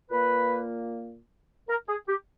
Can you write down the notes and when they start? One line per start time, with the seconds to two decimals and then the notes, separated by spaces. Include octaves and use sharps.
0.11 A#2 A#3 B4
1.69 A#4
1.88 G#4
2.09 G4